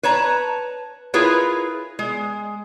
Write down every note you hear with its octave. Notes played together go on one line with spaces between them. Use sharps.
B4 C#5 A5 A#5
E4 F4 G#4 A#4 B4 C#5
G#3